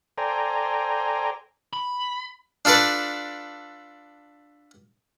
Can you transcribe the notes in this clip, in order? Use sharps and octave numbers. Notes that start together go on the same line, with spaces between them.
A4 C5 D5 G5 G#5 A#5
B5
D4 F4 A4 B4 D5